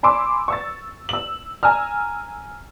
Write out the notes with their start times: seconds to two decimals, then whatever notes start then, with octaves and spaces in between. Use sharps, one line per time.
0.03 G#5 B5 C6 D6 E6
0.48 C#6 E6 A6
1.09 E6 F#7
1.63 G#5 A#5 E6 F6